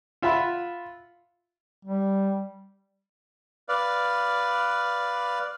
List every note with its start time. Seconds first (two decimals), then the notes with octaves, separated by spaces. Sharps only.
0.22 F4 E5 F#5 B5
1.85 G3
3.69 B4 D5 F5